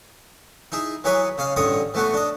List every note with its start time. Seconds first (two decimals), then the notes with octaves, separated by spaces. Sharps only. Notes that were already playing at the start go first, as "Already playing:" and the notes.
0.72 D#4 E4 G#4
1.04 E3 F#3 G#4 B4 C#5 D#5
1.38 C#3 D#5 F5
1.56 A1 G2 D3 C#5 D#5 D#6
1.94 E3 A3 B3 F#4
2.14 D4 D#5